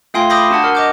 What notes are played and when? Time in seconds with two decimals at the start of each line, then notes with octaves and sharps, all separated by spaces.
0.14 A3 F4 F5 G5 G#5 C6
0.30 B5 D6 D#6 G6 A#6 C7
0.50 D4 F#4 F#5 A5
0.63 F#4 A#4 F#5
0.75 D#5 D6 G6